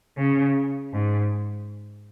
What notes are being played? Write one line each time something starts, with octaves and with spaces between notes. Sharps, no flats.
C#3
G#2